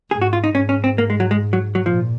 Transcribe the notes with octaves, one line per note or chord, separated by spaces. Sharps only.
G#2 G#4
F#4
F4
D#4
G#2 C#4
C#4
C4
A#3
G#3
F#3
G#3
F#3
F#3
A#2 F3